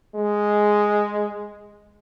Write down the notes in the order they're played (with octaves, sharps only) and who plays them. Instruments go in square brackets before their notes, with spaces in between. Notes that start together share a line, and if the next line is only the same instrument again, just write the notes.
[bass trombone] G#3